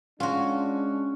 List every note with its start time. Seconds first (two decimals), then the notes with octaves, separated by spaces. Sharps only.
0.20 G#3 C#4 D4 F4 F#4